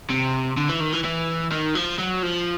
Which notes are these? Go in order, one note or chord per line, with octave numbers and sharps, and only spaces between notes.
C3
D3
E3
D#3
E3
E3
D#3
F3
F#3
F3